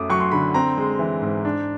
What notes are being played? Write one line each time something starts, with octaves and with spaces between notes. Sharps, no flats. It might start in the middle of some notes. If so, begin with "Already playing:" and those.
Already playing: F#2 A3 C#4 D6 D#6
F#3 C#6
C6
D3 B5
C4 A#5
G#3
E3
G#2
D4